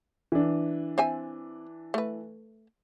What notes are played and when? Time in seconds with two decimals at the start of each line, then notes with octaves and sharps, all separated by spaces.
0.32 E3 D4
0.98 C4 E5 G#5
1.94 A3 B4